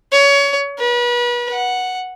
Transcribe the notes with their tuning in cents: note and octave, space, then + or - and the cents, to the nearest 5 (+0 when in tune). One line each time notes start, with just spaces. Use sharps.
C#5 +25
B4 -35
F#5 -5